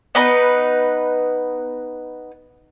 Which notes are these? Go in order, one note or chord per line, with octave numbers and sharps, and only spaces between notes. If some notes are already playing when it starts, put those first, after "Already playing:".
B3 D#4 B4